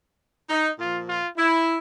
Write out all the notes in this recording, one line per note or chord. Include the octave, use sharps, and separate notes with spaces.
D#4
A#2 F3 F4
F4
E4